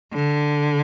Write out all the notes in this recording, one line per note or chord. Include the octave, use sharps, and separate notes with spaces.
D3